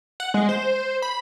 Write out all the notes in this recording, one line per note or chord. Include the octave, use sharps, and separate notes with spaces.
F#5
G#3
C5
B5